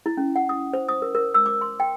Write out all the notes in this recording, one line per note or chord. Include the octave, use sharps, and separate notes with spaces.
E4
C#4
F#5
D#6
C5
D#6
A#4
A#4
E6
D6
C6
G5